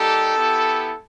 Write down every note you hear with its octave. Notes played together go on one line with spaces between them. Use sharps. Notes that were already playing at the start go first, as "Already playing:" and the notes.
Already playing: G3 A#3 D#4 G4 A4
B3 E4 G4